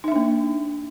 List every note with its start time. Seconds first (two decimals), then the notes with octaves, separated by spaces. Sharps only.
0.04 D#4
0.08 E5
0.12 D4
0.16 A#3